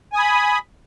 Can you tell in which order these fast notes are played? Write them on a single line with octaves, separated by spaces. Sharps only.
G#5 D#6 B5